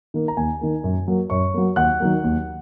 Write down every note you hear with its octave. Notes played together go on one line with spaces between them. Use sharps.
D#3 A#3
A#5
D#2 G#5
D#3 A#3
F#2
F#3 A#3
F#2 C#5 C#6
F#3 A#3
D#2 F#5 F#6
D#3 F#3 A#3
D#2